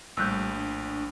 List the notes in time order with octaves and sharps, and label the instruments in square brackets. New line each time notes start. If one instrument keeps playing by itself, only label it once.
[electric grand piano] A#1 A2 [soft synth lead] G3 [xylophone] E6 F#6 G6
[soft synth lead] D4